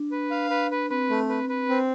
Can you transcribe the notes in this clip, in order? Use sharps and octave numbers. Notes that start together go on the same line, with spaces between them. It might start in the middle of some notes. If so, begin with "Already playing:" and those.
Already playing: D4
B4
F5
B4
B4
C4 B4
A3
B4
B4
C4